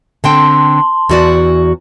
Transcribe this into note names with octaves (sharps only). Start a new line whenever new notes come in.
D3 C4 G5 A5 C6
E2 F#4 D5